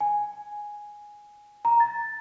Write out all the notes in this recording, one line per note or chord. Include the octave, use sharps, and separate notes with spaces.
G#5
A#5
A6